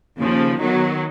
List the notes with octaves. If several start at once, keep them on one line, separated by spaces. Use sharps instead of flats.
D#2 C#3 F3
D#3 F#3 B3